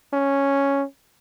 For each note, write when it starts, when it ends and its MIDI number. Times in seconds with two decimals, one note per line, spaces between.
0.13 0.83 61